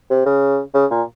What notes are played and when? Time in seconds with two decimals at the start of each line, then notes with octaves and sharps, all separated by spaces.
0.10 C3
0.26 C#3
0.74 C#3
0.91 A#2